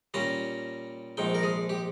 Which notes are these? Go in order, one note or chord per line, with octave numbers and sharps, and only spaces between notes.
A#2 G3 C#4 A#5
A#1 G#2 F3 G5
A#4
G#4
G4